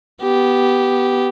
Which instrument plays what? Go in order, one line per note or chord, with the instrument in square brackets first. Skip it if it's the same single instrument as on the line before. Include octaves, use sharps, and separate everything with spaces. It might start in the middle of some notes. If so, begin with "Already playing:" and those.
[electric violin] B3 G4